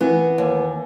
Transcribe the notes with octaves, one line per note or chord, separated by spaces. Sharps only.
E3 B3
D#2